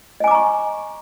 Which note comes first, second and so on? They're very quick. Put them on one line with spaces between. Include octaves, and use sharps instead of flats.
D#5 G#5 D6 A#5 C#6